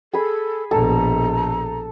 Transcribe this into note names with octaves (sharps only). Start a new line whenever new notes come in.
G#4 A4 B5
A#1 B2 A4 A#5